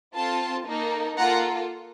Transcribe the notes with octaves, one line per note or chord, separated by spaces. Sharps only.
C4 F4 A4 A5 C6
A#3 D#4 A4
A#3 F4 A4 F#5 A#5